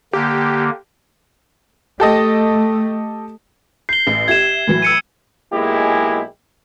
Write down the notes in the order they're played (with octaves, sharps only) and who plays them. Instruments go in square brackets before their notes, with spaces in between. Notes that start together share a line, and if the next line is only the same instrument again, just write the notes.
[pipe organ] D3 A#3 [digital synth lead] G4
[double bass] A3 [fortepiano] G4 A4 D#5
[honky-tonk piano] G6 [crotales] C7 G7
[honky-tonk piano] A1
[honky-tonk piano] G4 E5 [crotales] G#6 E7
[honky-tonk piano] A2 E3 F#3
[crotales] E6 C#7 D#7
[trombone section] B1 G#3 A#3 E4 G4 G#4